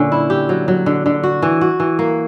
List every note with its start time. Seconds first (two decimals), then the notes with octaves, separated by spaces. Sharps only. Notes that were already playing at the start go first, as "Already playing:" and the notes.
Already playing: A#2 D3 C#4
0.12 E4
0.30 G4
0.49 F#3
0.68 F#3
0.86 D3
1.06 D3
1.23 F#4
1.42 E3
1.61 F#4
1.80 E3
1.99 A#3